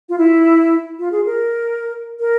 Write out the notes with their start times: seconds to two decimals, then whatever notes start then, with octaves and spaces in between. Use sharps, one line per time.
0.09 F4
0.18 E4
0.99 F4
1.12 G#4
1.26 A#4
2.20 A#4